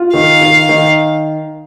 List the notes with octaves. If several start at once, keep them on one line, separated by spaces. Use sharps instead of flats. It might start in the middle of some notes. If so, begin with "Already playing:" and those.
Already playing: F4
D#3 F5
D#3
D#3